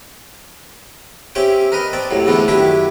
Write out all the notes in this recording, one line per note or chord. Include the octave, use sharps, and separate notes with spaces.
C4 C#4 G4 E5 G5
A#4 B4 D#5
C4 D5 A5
C2 A2 F#3
E2 G#2 D3 A3 B3 D4
F#2 D#3 D4 E4 G4 E5